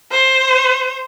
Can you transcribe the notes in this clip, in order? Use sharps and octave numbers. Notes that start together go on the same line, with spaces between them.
C5